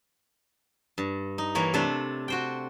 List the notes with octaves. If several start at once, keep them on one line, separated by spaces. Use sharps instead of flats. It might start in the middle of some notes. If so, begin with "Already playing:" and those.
G2
D#4
E3 A#3 C#5
C3 A3 D4 C5
F#4 C5 G5